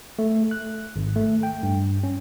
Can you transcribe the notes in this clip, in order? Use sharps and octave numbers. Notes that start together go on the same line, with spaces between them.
A3
F#6
G#1
A3
G5
G2
C#4